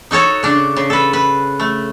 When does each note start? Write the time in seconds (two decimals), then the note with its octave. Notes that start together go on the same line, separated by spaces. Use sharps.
0.11 D#4 F#4 A4 C#5
0.43 C#3 D4
0.76 C#3
0.90 A4 B4
1.13 B4
1.60 A3